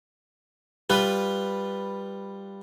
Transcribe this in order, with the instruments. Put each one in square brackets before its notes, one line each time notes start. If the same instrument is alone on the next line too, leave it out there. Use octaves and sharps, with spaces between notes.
[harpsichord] G3 F4 [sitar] B4